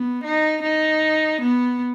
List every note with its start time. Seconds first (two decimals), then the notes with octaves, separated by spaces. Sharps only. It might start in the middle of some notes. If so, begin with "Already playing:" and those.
Already playing: B3
0.24 D#4
0.63 D#4
1.41 B3